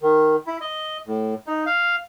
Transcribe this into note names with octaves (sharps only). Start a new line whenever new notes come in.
D#3
E4
D#5
A2
D#4
F5